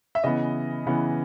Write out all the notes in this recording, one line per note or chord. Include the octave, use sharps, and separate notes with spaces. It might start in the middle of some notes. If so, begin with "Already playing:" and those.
E5
C#3 E3 B3 D#5
C#3 E3 B3